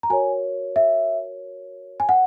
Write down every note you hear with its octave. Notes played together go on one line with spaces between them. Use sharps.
A#5
F#4 A#4 C#5 G#5
E5
G#5
F#5